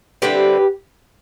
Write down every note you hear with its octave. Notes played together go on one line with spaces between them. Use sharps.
D3 G3 C4 E4 G4 B4